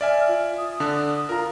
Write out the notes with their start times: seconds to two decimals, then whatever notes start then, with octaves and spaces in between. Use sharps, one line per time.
0.01 D5 E5 G#5 F6
0.28 F4
0.57 D#6
0.80 D3 D4 D#6
1.29 F4 A#4 A#5